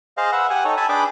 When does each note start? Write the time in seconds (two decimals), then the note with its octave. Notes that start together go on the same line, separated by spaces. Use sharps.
0.17 G#4 C5 D#5 F5
0.32 B4 E5 F#5
0.50 G4 F#5 G#5
0.65 D#4 A4 C#5
0.77 E5 G#5 A5 B5
0.89 D4 G#4 B4 G5 B5 D6